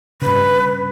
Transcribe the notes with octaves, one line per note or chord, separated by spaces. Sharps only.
G2 C#3 B4